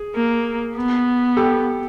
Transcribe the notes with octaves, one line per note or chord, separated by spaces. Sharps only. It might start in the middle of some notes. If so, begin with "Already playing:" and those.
Already playing: G#4
A#3
B3
G4 A4